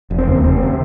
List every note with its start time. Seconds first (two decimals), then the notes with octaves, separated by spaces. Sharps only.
0.10 F1
0.18 C4
0.27 D#2 C#3
0.36 A#3
0.44 F1 C4
0.62 C#3